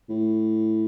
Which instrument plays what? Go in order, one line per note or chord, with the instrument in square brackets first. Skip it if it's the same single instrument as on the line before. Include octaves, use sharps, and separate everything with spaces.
[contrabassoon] A2